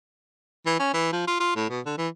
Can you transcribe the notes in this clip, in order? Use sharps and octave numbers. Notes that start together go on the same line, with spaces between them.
E3
C#4
E3
F3
F4
F4
A2
B2
D3
E3